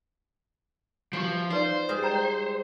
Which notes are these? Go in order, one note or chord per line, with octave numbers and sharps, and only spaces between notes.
E3 F3 F#4 G4
D#4 F4 B4 C5 D5
G3 G#3 B4 D5 F#5 D#6
G5 A#5